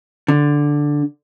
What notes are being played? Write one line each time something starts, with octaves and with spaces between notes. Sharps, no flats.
D3